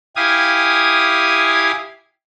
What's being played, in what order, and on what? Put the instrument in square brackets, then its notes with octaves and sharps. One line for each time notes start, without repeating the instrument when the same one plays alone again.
[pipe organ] E4 G4 F5 G#5 D#6